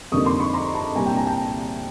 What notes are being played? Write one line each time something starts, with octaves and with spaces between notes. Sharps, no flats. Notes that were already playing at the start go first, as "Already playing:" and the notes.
F2 D3 G3 A#3 D#4 C#6 D#6
C6 D6
B5 C#6
A#5 C6
A5 B5
C2 A#2 G3 G#5 A#5
G5 A5
G#5 A#5
G5 A5